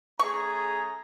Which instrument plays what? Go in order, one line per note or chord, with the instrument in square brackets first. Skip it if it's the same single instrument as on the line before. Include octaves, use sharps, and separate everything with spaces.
[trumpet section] A3 C#4 A#5 [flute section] G#4 [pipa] C#6